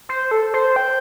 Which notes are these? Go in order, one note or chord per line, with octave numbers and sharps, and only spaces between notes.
C5
A4
C5
G5